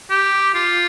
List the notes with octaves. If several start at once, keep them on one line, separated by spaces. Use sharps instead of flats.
G4
F4